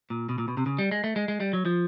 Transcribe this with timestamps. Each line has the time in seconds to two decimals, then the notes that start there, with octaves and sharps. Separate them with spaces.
0.10 A#2
0.29 B2
0.38 A#2
0.48 B2
0.57 C3
0.66 C#3
0.78 G3
0.91 G#3
1.04 A3
1.16 G#3
1.28 G#3
1.40 G3
1.53 F#3
1.65 F3